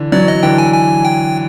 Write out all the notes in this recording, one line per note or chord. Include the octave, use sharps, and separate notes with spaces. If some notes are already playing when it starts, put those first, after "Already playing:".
Already playing: D3 E3
E3 F#3 D5
D#5
D3 E3 G5
G#5
G#5
G5